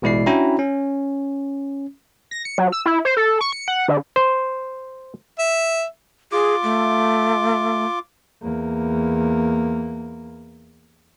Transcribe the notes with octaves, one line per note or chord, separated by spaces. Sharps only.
A1 B2 G#3 E4 D5 C7
C#4 D4 E4 F#4 G5 A#5
C#4
A#6
C#7
F#3
E6
E4
C5
A4
C#6
C#7
F#5
D3
C5
E5
F4 G#4 D6
A3
E2 A#3